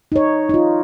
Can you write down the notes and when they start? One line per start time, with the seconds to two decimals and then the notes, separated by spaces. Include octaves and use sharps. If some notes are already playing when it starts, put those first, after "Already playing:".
0.12 D#4 C#5
0.49 D#4 F4